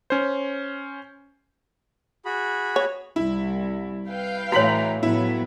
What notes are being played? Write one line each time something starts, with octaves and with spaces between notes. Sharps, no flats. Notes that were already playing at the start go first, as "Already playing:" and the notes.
C#4 C5
F#4 G#4 B5
C#5
C2 E4
B4 F5 G5
A2 E3 F#4 C#5 A#5 B6 F#7
A2 F3 F#3 B3 E4